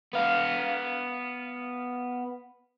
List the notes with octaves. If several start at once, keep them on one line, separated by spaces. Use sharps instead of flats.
B3 F5